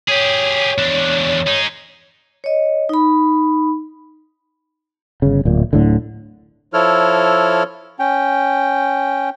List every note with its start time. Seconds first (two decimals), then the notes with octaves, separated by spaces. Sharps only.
0.09 G4 G#4 C#5
0.78 E2 D4
1.47 D#4 G#4
2.44 C#5 D#5
2.89 D#4 B5
5.22 G1 C#3
5.45 D1 A#2
5.73 D1 A2 D3
6.73 F3 E4 A4 C#5 F6
7.99 C#4 G5